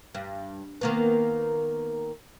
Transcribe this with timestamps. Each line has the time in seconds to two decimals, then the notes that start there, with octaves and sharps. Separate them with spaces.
0.15 G2
0.81 D#3 A#3 B3